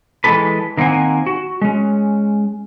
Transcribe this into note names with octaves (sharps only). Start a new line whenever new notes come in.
E3 G#3 C#4 G4 A4 B4
D#3 A#3 C4 F#5 G#5
F#4
G#3 C#4